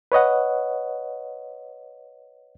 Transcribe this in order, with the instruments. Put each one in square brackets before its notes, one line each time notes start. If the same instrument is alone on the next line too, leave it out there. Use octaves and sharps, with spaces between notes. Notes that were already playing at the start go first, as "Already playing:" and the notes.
[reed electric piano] B4 C#5 D#5 F#5